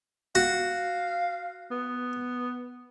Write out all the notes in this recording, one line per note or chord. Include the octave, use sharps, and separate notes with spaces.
F#4 F5
B3